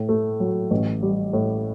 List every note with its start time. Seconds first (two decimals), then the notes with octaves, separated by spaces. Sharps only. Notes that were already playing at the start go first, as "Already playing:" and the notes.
Already playing: A2
0.09 A3
0.40 F#3
0.71 A1
1.03 G3
1.33 A2